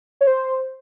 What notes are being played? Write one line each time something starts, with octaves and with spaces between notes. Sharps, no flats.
C#5
C5